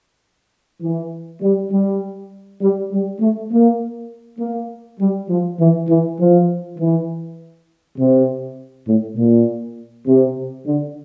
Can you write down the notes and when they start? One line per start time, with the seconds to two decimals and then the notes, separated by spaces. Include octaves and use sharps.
0.82 E3
1.42 G3
1.71 G3
2.61 G3
2.91 G3
3.20 A3
3.50 A#3
4.39 A#3
5.00 G3
5.29 F3
5.58 E3
5.88 E3
6.19 F3
6.78 E3
7.97 C3
8.87 A2
9.16 A#2
10.06 C3
10.65 D3